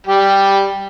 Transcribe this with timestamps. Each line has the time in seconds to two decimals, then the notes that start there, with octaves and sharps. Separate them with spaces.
0.07 G3 G4